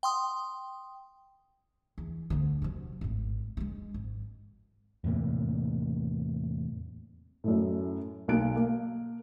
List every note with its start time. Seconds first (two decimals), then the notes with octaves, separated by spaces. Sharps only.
0.03 G5 C6 D#6
1.98 E2
2.30 D2 D3
2.62 C3 F#3
3.01 G#1 A2
3.57 G3 G#3
3.94 G#1
5.04 E2 A2 C3 A#3
7.44 F#2 A2
8.28 B1 A#3 F#6 D7
8.56 A#3